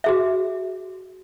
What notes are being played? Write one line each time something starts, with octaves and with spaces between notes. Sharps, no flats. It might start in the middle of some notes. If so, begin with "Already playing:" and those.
F#4 G#4 E5